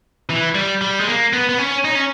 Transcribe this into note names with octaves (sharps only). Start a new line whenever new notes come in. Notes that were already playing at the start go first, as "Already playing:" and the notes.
E3
G3
G3
G#3
A#3
B3
B3
C#4
D#4
C#4